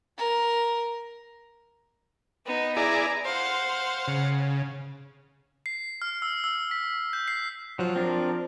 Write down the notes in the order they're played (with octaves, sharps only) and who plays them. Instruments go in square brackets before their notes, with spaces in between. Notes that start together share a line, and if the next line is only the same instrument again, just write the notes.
[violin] A#4
[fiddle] B3 D#4
[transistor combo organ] E4 G#4 D5 [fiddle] A#5
[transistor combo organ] C5 [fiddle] F5 F#5
[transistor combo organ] C#3
[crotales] C7
F6
E6
E6
B6
G6
C7
[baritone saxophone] F3 [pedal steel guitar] F#3
[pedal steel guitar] C4 D4 A#4